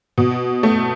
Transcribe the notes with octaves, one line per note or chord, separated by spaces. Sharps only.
B2
A3